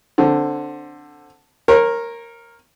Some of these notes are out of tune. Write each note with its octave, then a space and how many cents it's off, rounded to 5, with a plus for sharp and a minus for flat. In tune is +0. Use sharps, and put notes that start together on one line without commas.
D3 +0 C4 +10
A#4 +0 C#5 -35